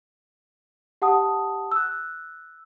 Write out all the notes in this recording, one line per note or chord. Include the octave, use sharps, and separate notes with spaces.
G4 F#5 A5 D#6
E6 F#6